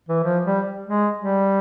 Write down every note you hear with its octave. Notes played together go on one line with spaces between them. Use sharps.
E3
F3
G3
G#3
G3